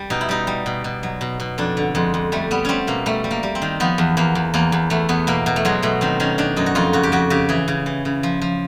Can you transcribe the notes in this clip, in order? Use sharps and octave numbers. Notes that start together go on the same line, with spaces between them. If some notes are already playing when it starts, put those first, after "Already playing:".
Already playing: G3
B2 D#4
E4
G3 D#4
G3
B2
B2
F#3
B2
B2
F2 D4
D3
F2 G#3
F2
G3 A3
G3 B3
G3 C4 C#4
B2 A#3
G3 A3
G3
A#3
G3
C4
D#3
F3 B3
E2
E2 A#3
E2
E2 A#3
E2
E2 A3
E2 B3
B2 A#3
B2
A3
F#3 G#3
B2 A3
D#3 C4
D#3 C#4
D#3 D4
F#2 D#4
F#4
F2 F4
C#3 F#4
G4
F2 F#4
C#3 G4
E3 G#4
C#3
E3
C#3
F3
F3